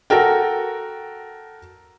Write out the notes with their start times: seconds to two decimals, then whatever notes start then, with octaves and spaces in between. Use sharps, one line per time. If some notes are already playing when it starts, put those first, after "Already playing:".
0.10 F#4 A4 A#4 G5